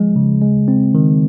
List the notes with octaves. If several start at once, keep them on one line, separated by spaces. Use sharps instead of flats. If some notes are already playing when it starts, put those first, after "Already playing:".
Already playing: F3 G#3
C#3
G#3
C4
D#3